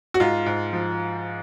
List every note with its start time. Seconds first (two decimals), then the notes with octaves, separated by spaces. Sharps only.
0.14 F#4
0.20 G#2 F4
0.46 G#2
0.73 F3